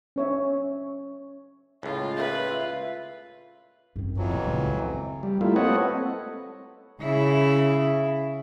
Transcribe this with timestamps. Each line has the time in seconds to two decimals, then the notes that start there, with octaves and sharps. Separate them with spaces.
0.16 C#4 C#5 E5
1.83 C#2 A2 F4
2.17 B4 E5
3.96 F#2 C4
4.17 F2 E3 F#3 F4
4.30 A1 A#2
4.44 C#2
5.23 G3
5.41 G3 A3 A#3 E4 F4
5.56 C4 A4 B4 C#5 D#5 F#5
7.02 C#3 E4